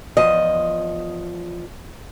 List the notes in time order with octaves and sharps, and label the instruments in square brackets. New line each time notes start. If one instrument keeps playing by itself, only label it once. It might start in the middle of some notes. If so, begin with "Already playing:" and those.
[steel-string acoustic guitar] E2 F3 D#5